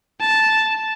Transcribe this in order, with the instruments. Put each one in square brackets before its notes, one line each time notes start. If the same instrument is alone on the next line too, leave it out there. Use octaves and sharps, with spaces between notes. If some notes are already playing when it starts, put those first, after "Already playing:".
[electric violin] A5